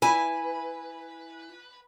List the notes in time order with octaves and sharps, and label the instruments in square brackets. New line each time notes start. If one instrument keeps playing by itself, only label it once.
[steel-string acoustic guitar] E4 G#5 [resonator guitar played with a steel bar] B4